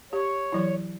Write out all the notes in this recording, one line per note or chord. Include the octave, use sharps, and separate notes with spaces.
G4 C#5
E3 F#3 E4